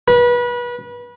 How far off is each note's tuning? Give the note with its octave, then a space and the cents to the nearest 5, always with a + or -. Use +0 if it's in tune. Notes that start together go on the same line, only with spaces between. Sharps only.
B4 -30